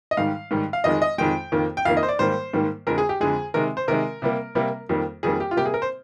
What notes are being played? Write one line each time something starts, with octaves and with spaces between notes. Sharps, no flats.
D#5
G#2 D#3 G3 F5
G#2 D#3 G3
F5
F2 D#3 G#3 D#5
D#5
F2 D#3 G#3 G5
F2 D#3 A#3
G5
F2 D#3 A#3 F5
D#5
C5
D5
G#2 D#3 G3 A#3 C5
G#2 D#3 G3 A#3
F2 D3 G#3 A#4
G#4
G4
F2 D3 G#3 G#4
C3 D#3 G#3 A#4
C5
C3 D#3 G#3 A#4
C3 G3 A#3
C3 G3 A#3
F2 D#3 G3 A#3
F2 D#3 G3 A#3 G#4
G4
F4
C3 G3 A#3 G4
G#4
A#4
C5